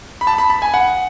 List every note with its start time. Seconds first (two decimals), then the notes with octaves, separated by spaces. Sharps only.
0.21 B5
0.27 A5
0.38 B5
0.50 B5
0.62 G#5
0.74 F#5